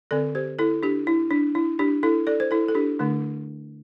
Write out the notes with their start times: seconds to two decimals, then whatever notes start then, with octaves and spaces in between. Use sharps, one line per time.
0.11 D3 C4 A4 D5
0.35 G4 C5
0.59 E4 A4
0.83 D4 G4
1.07 E4
1.31 D4
1.55 E4
1.79 D4 G4
2.03 E4 A4
2.27 A4 D5
2.40 C5
2.51 E4 A4
2.68 A4
2.75 D4 G4
2.99 D3 A3 D4